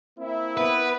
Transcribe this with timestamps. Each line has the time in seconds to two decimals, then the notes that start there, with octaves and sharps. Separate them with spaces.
0.18 A#3 C4 E4
0.57 B3 B4